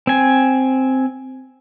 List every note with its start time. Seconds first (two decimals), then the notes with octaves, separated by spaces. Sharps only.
0.07 C4 G#5